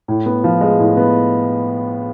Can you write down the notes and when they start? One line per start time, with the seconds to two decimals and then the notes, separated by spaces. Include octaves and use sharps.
0.08 A2
0.26 B3
0.44 F3
0.61 G#3
0.79 A2
0.97 B3